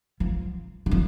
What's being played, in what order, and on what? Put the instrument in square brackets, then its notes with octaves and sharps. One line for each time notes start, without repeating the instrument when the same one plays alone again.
[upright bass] F3
D#3
F3